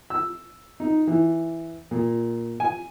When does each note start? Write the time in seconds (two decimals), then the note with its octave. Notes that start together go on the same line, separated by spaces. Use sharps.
0.10 E6
0.80 D#4
1.07 E3
1.91 A#2
2.60 G#5